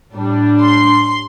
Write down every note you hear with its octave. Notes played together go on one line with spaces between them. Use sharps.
A2 G3 D4
C6